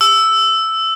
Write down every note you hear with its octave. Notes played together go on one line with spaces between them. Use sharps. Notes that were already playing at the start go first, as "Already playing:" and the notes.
E6